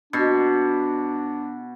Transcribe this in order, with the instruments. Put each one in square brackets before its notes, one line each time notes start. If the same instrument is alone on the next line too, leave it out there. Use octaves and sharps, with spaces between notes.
[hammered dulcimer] B2 [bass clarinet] D4